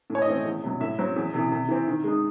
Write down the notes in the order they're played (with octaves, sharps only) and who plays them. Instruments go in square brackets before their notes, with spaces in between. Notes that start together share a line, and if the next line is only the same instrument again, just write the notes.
[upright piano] A2
C#5
D#5
E3 A3 C4
E2
C3 F#3
A2 E5
F#3 C4
E2
C3 E3
C3
E3 C4
D#3
G#3 D#4